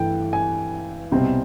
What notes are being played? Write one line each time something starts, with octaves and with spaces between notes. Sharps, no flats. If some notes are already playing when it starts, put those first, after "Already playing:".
Already playing: G2 E3 A3 G5
G#5
C2 B2 G3 C4